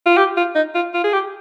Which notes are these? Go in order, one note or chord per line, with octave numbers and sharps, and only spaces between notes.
F4
G4
F4
D#4
F4
F4
G#4
G4